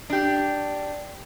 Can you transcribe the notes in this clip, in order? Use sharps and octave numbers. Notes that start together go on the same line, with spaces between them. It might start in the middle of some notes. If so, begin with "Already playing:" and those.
D4 G4